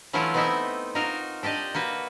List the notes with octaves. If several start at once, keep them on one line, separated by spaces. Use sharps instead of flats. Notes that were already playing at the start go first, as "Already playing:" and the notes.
E3 F#3 A3 C#4 E4 F4
B3 C4 D#4 E4 D#5 E5
D#4 F4 F#4 A#4 F5
D4 G4 D5 D#5
A#3 F#4 B4